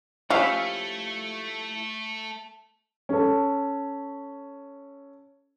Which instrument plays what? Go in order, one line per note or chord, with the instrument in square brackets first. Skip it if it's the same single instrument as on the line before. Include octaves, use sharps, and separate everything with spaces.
[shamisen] F3 C#4 [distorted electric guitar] A3 [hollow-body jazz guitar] E4 F4 G4 [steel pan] E5 F5
[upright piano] C#4 A4